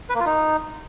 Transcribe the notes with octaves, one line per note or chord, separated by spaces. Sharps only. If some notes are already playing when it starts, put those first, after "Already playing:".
B4
A#3
F4
D#4